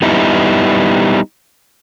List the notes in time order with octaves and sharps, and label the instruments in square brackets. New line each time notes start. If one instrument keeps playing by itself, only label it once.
[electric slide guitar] G3 B3 D#4 E4